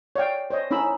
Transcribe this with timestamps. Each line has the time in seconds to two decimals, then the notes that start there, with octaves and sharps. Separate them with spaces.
0.16 C#5 D5 F5 G5
0.50 C5 C#5 D#5
0.71 C#4 D#4 E4 B5 E6